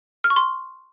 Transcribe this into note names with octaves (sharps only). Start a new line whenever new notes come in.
F6
C#6
C6